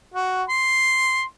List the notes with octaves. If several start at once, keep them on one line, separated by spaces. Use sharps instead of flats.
F#4
C6